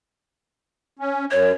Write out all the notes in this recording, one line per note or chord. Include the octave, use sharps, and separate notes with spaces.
C#4
F#2 C#5